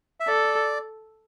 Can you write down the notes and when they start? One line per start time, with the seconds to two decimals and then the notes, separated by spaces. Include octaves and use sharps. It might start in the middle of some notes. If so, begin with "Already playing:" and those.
0.20 E5
0.27 A4 D5